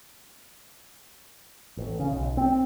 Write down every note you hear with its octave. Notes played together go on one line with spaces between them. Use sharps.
A1
C#3
B1
C4